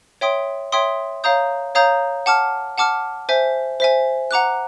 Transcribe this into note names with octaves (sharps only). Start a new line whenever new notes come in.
C#5 E5 G5 C6 D#6
C#5 E5 G5 C6 D#6
C#5 F5 A#5 D#6 G6
C#5 F5 A#5 D#6 G6
F#5 A5 D6 F6
F#5 A5 D6 F6
C5 E5 G#5
C5 E5 G#5
F#5 A#5 D6 F#6